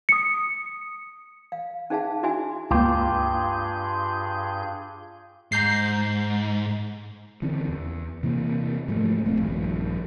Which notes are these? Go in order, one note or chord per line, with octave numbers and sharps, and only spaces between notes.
D#6 C#7
F5
C#4 D#4 G#4 E5 F5 A5
D4 E4 F#4 E5 G#5
C#2 G2 A#3 F4 G4 G#4 G6
G#2 A#5 G6 C7
D3 E3 C4 C#4
E2
C3 E3 A#3
G#2 F3 A3
E1 A3 A#3 C4
A#1 G2 D#3 F3